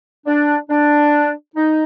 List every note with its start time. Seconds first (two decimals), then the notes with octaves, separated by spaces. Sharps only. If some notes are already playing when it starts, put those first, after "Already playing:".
0.27 D4
0.70 D4
1.56 D#4